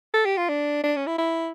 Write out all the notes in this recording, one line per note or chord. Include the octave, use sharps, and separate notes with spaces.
A4
G4
F4
D4
D4
C#4
E4
E4